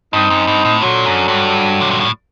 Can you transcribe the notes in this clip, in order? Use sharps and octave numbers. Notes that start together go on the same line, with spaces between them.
G2 C4 D#4
F#2
G2
A2
A#2 D3 F#3
F#2
G2
C3
A#2
A2